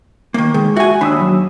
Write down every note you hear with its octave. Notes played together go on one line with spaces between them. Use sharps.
D#3 A#3
D#3 G#3 G#4
F#4 E5 G#5
D#2 D4 B5 D#6 E6
F#3